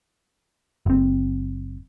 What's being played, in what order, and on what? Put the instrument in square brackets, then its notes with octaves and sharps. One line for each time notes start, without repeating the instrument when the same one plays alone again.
[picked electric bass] F#1 C4